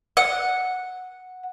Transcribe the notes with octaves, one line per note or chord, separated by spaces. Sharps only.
F#5